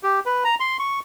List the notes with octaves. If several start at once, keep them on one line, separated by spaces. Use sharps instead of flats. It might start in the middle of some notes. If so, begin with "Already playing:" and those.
G4
B4
A#5
C6
C#6